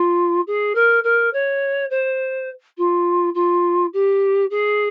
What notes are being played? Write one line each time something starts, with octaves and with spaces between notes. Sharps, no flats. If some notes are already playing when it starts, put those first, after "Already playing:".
Already playing: F4
G#4
A#4
A#4
C#5
C5
F4
F4
G4
G#4